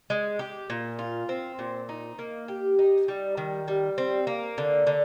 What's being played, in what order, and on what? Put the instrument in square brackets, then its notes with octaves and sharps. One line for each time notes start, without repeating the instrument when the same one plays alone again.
[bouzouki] G#3
G4
A#2
F4
C4
A#2
D#4
A#3
G4
D#4
G3
D#3
G3
C4
A#3
D3
D3